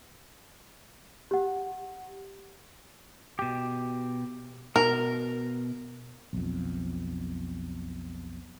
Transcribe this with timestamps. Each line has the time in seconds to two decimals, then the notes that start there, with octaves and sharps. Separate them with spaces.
1.31 G4 F#5
3.39 B2 G4
4.76 B2 A#4
6.33 B1 F2